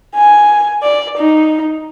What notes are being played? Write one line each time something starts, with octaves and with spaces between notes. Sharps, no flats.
G#5
D5
D#4